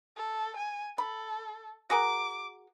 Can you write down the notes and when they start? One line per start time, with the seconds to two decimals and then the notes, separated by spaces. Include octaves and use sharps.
0.17 A4
0.57 G#5
0.98 A4 B5
1.90 F#4 G#4 A#4 D6